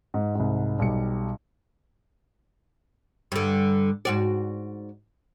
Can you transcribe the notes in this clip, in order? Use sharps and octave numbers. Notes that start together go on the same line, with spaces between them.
G#2
C2 G#2
B1 G3 C#7
G2 D3
G#2 F#4 D5